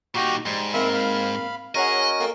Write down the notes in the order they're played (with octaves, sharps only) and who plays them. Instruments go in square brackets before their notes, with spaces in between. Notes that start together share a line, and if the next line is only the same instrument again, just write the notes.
[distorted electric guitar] A#2 D#4 [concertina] F#4 G4
[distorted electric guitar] G#2 [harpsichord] G3 [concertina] C6
[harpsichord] A#3 C4 A#4 [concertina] E5 B5
[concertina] F5 B5
[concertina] C#4 F#4 A#4 [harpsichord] G#4 C#5 F#5 [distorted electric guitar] D#5
[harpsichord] A#3 A4 G5